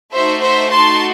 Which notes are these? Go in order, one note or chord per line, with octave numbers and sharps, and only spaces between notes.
A3 D#4 F#4 C5 E5
C5 E5
A5 C6